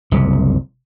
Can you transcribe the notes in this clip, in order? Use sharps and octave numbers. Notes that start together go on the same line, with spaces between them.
F#1 C2 C3